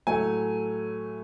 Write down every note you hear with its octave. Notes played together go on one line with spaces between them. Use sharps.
A2 F#3 A3 G#5